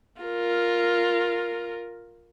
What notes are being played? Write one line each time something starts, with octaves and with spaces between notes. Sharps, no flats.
F4 A#4